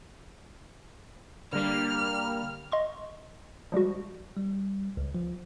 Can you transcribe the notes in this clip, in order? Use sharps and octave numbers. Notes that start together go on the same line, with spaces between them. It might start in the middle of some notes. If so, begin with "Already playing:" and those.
D3 G3 A#3 F6
D#5 C6 C#6
F3 G3 G#3 F#4
G3
C#2
F3